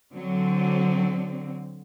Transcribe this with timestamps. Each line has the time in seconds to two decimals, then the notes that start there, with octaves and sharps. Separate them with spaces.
0.13 D3 F#3 C4